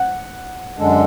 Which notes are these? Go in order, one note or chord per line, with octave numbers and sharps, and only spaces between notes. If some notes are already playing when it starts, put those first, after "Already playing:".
Already playing: F#5
F#2 D3 G#3 D4 A4